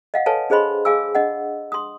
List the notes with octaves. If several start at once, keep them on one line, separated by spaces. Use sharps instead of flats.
D#5 F5 F#5
A4 B4 C#5 F5 G#5 A5
D4 G#4 C5 D#5 B5 C6
G#4 F5 G#5 D6 E6
D4 D#5 F#5
C6 D#6